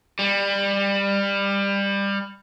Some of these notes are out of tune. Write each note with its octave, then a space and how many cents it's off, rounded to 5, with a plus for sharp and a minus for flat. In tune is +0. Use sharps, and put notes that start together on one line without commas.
G3 +20